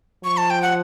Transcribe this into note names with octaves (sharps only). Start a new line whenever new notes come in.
F3 C#6
A5
G5
F#5